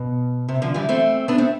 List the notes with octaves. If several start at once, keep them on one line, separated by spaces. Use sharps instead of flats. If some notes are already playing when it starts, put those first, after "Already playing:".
Already playing: B2
C3
D3 F3
E3 G3
A3 C4
B3 D4
A3 C4